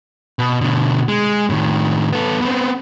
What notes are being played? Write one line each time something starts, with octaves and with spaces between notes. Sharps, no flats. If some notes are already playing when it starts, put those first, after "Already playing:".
B2
B2 D3
G#3
A2 D#3
B3 A4
B3 C4